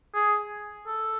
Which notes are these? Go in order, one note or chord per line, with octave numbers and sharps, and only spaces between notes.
G#4
A4